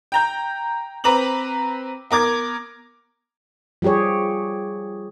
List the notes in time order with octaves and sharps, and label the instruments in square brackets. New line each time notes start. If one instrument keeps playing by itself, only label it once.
[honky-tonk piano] G5 A#5 G6
C4 B4 A#5 D6 F#7
B3 A#4 D6 G#6
[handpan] F3 G3 G4 G#4 C#5